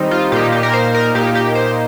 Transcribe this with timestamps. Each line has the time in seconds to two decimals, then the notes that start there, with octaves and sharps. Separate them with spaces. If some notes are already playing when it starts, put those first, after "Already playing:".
Already playing: D#3 G3 C4 D#4
0.11 F4
0.32 A#2 A#3 D#4 G4
0.52 G4
0.63 A#4
0.73 C5
0.95 A#4
1.15 A#2 A#3 D#4 G4
1.35 G4
1.55 C5